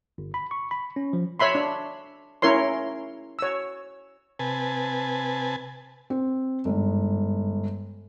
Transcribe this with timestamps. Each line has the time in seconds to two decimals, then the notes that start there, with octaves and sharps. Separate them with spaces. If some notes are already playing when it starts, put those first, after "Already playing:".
0.18 G1
0.34 B5
0.51 C#6
0.71 B5
0.96 C#4
1.13 F3
1.40 C#5 E5 B5 C6
1.55 D4
2.42 C#4 E4 A#4 C#5 C6
3.39 C#5 E6
4.39 C3 B4 G#5 A5
6.10 C4
6.65 G1 G#2